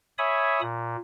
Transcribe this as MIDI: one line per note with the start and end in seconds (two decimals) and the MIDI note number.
0.18 0.61 73
0.18 0.61 76
0.18 0.61 80
0.18 0.61 83
0.18 0.61 87
0.61 0.96 46